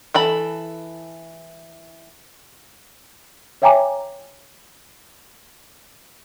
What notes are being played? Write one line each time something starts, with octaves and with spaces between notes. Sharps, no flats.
E3 A4 B5
C#5 E5 G5 G#5 A#5 D6